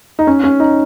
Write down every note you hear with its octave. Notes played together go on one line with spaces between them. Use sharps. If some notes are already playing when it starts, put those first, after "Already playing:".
D#4
C#4
C#4
D#4